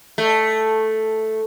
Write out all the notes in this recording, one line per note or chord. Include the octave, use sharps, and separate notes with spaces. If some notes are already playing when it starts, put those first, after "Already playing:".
A3